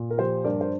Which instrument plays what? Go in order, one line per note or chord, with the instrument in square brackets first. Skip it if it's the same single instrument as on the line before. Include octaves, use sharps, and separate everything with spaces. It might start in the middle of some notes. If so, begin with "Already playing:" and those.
Already playing: [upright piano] A#2
A#4
F3 G4 C5
G2 A#4 D5
C5